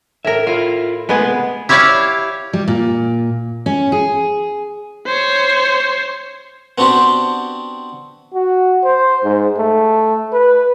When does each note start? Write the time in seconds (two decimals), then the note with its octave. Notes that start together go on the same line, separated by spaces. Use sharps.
0.25 A2 A#4 E5
0.47 E4 F4 F5
1.09 G#3 A3 B3 G#4 B4
1.24 C3
1.69 E4 G4 C#5 D5 F5
2.53 G3
2.68 A#2
3.66 C#4
3.92 G#4
5.06 C5 C#5
6.78 B3 C4 D4 F#4 G4 C5
8.34 F#4
8.84 C5
9.24 G#2
9.58 A3
10.32 B4